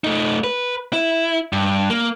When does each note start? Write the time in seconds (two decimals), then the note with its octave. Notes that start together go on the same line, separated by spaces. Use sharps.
0.04 A3 D#4
0.44 B4
0.93 E4
1.53 G2
1.90 A#3